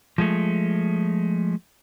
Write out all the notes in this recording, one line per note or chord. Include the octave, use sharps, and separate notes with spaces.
F3 G#3 A3